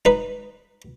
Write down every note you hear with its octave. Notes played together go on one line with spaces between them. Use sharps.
D#4 B4